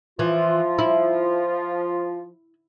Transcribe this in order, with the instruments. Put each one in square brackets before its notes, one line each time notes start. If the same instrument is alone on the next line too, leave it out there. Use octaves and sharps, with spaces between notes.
[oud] E3 [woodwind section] F3 F4
[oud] E4